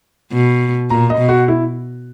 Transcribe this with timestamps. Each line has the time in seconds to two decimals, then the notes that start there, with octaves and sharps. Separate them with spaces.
0.32 B2
0.90 A#2 A#5
1.10 D#5
1.18 B2
1.29 F#4
1.48 E4